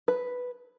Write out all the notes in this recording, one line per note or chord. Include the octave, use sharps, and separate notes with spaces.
B4